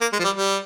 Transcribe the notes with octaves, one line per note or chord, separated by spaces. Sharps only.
A#3
G#3
F3
G3
G3